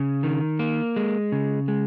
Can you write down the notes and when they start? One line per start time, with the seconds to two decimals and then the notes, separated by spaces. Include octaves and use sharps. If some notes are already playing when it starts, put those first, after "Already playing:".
Already playing: C#3
0.23 D#3
0.59 A#3
0.96 G#3
1.32 C#3
1.68 G#3